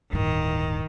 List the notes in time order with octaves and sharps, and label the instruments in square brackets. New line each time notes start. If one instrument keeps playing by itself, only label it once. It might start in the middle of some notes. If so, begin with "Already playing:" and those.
[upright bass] D1 G2 [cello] D#3